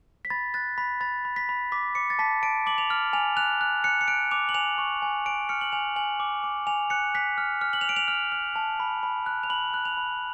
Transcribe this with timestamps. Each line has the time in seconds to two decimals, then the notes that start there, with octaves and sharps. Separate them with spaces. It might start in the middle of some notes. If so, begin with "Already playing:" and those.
0.25 B6
0.30 B5 A6
0.54 F#6 A6
0.78 B5 B6
1.01 B5 A6
1.25 B5
1.36 B6
1.49 B5
1.72 D6 B6
1.95 D6 C#7
2.10 A6
2.19 A5 B6
2.43 A5 D7
2.66 D6 F#7
2.78 F7
2.90 F6
3.13 G#5 F7
3.37 F#6 F7
3.61 F#6
3.84 F#6 C#7
4.01 C#7
4.08 F#6 D7
4.31 D6 F7
4.49 F#7
4.54 G#5 F7
4.78 C#6
5.02 G#5
5.26 G#5 D7
5.49 F6 C#7
5.61 F#7
5.72 G#5 F7
5.96 G#5 F#7
6.20 D6
6.44 D6
6.67 G#5 F7
6.90 F#6 C#7
7.14 F#6 B6
7.38 F6
7.61 F6
7.73 F#7
7.81 F7
7.85 F6 D7
7.96 F7
8.08 F6
8.32 F6
8.56 A5
8.80 B5
9.03 B5
9.26 F#6
9.43 F7
9.50 B5 F#7
9.74 F#6
9.85 F7
9.97 B5